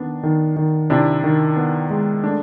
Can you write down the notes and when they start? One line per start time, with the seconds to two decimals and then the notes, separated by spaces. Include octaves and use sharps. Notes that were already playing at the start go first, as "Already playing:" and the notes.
Already playing: D#3 B3 D4
0.23 D#3
0.56 D#3
0.90 C3 D4 E4
1.24 D#3
1.56 B3
1.90 G#3
2.24 A3 D4